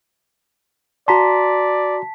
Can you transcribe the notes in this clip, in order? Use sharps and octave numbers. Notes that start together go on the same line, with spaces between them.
F#4 D5 A5 A#5 C6 B6